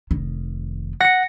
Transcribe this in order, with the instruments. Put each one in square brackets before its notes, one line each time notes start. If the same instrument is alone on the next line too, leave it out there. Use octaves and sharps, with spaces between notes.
[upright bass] F1 D#3
[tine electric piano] F#5 [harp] A#6 C#7